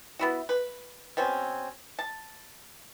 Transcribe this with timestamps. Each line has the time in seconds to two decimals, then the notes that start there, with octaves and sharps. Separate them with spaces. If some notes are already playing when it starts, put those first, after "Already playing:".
0.19 B3 E4 F#4
0.49 B4
1.17 B2 C4 C#4
1.99 A5